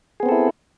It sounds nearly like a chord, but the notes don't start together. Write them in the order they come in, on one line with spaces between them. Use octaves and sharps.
G#4 B3 C4 A4 E4